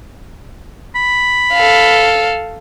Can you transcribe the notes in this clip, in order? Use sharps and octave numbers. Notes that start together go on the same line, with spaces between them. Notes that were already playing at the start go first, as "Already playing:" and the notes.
B5
A4 F5